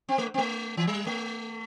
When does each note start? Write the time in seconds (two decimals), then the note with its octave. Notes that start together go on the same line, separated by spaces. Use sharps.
0.09 C4
0.18 A3
0.34 C4
0.38 A3
0.77 E3
0.87 G3
1.07 A3